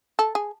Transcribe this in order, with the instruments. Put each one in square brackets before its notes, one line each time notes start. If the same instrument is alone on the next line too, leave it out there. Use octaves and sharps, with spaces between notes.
[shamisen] A4
G#4